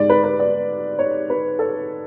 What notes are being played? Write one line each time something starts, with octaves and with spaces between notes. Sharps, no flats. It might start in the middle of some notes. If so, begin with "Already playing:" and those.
Already playing: G#2 G#3 D5
B4
B4
D5
C#5
B4
A4